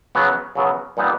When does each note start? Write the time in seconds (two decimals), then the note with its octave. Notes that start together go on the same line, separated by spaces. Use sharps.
0.15 C#3 F#3 B3
0.55 C#3 F#3 B3
0.97 A#2 G3 B3 D#4